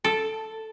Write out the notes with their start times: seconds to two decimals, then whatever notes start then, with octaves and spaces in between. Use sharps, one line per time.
0.04 A4